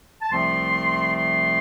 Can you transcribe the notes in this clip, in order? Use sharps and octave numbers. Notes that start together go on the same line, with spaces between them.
A5
C2 C3 F3 A3 C4 C6
C6